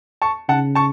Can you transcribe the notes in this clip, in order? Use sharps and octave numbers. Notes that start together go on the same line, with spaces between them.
A5 C#6
C#3 F#5 A5
A5 C#6